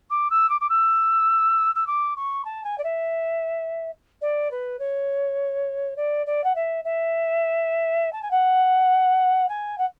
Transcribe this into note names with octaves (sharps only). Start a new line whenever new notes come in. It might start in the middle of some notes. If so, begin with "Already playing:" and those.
D6
E6
D6
D6
E6
E6
D6
C#6
A5
G#5
D5
E5
D5
B4
C#5
D5
D5
F#5
E5
E5
A5
G#5
F#5
G#5
F#5